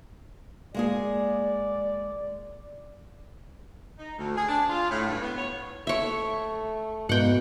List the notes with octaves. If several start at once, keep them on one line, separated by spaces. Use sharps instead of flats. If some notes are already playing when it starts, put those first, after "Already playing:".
G#3 A#3 G#4 D5
D#4
D2
G#4
D4
F4
A2
G2
B3
C#5
A3 C#5 E5
G#2 B2 A#3 F#5 G5